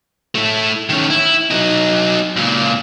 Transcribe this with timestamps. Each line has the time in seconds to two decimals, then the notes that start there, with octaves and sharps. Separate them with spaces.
0.35 A3 E4
0.89 D#3 C#4
1.10 E4
1.51 F#3 D#4
2.36 C#2 A#2